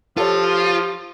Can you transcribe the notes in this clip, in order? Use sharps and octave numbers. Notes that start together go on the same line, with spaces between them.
F3 F4 G4 A4 C#5